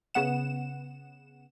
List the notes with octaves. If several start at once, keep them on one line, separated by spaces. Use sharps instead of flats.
C#3 B3 F#5 E7